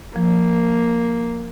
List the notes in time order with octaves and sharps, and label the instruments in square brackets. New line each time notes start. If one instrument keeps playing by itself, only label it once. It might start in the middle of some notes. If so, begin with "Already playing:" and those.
[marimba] F3 [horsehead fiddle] A#3